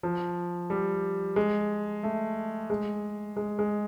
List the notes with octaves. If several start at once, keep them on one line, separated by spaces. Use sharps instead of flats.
F3
G3
G#3
A3
G#3
G#3
G#3